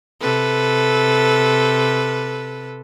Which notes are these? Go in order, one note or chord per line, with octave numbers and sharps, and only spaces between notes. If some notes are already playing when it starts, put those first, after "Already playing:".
C3 A4 B4